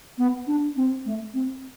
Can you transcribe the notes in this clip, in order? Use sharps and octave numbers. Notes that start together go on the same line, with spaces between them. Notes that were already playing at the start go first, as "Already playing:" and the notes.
B3
D4
C4
A3
C4